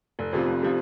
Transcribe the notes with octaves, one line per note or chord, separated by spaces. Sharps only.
F1
F2 C3 F3
F1
C3 F3